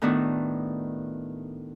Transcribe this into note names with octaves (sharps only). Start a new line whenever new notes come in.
A2 D#3 B3 D4 F#4